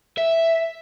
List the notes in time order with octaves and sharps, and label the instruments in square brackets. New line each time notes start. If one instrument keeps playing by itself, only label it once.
[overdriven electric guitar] E5